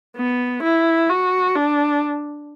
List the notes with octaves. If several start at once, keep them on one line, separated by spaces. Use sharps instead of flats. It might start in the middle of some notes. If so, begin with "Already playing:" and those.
B3
E4
F#4
D4